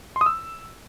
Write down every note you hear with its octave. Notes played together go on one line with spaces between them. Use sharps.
C6
D#6
E6